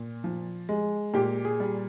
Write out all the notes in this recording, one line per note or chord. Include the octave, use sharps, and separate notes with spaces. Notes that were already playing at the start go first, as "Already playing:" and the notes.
Already playing: A#2
F3
G#3
A#2 G4
G#4
G3